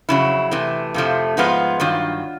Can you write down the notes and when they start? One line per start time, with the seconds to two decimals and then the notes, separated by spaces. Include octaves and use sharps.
0.09 F2 C#3 F#3 E4
0.51 C3 E3 A3
0.94 F2 C3 F3 A3
1.37 G#2 F3 G#3 B3 F4
1.80 G2 D#3 F#3 F4